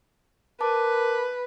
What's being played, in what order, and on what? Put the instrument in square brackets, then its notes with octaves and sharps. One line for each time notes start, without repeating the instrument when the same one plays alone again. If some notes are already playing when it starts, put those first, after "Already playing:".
[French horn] A#4 [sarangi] B4 [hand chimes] A5 D6